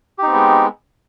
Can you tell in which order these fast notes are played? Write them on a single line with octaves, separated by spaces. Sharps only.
G4 D#4 C4 B3 G#3